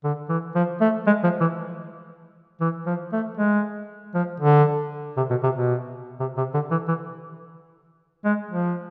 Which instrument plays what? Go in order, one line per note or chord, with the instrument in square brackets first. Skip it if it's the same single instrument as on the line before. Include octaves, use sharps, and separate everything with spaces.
[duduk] D3
E3
F3
A3
G#3
F3
E3
E3
F3
A3
G#3
F3
D3
C3
B2
C3
B2
C3
C3
D3
E3
E3
G#3
F3